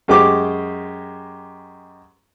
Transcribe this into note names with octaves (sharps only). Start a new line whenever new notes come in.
F#2 G#3 G4 C5 D6